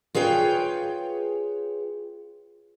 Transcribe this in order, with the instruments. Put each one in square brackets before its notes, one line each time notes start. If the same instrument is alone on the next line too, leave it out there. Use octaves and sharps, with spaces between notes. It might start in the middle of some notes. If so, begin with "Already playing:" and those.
[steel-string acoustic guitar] F4 G#4 B4 C#5 G5